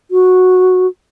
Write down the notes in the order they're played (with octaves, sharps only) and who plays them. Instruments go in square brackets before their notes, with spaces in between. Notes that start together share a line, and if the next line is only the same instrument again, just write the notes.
[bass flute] F#4